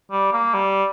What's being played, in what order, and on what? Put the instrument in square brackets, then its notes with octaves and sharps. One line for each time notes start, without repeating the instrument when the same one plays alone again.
[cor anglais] G3
A#3
G3